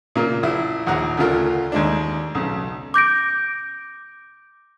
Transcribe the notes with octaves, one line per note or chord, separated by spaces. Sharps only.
A#2 C#3 A#3 F4
A#1 E4
A#1 D#2 F#5 A#5
D2 C#3 A3 F4 A#4
D#2 G#3 D4
B1 C#3
D6 G6 A#6 D7